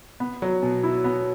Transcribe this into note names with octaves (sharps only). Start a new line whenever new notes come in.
B3
F#3
B2
E4
B3